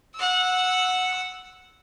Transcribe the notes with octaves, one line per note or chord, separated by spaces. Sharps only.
F#5 E6